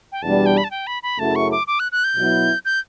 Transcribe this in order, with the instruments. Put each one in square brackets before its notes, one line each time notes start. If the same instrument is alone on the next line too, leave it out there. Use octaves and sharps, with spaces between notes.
[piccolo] G5
[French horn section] E2 B2 G3 D4 [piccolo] A5
[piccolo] G5
B5
A5
G5
B5
B5
[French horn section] F#2 C#3 F#3 A3 E4 [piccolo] A5
[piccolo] C#6
D6
D6
F#6
F#6
G6
[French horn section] B2 F#3 B3 E4
[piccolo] G6